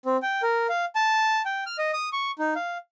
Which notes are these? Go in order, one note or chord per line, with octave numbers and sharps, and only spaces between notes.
C4
G5
A#4
F5
A5
G5
F6
D#5
D#6
C#6
D#4
F5